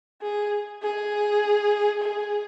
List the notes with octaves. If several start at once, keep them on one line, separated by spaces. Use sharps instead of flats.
G#4
G#4
G#4